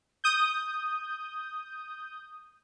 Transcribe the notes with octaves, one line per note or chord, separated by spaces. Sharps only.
D#6 G6